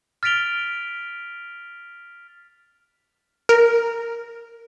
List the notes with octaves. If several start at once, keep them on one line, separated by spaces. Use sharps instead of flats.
F6 A6 B6 D7 F7 G7
A#4